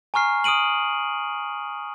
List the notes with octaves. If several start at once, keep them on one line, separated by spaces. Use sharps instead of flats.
G#5 A#5 C#6 F6 C7
D#6 F6 D7 D#7 F#7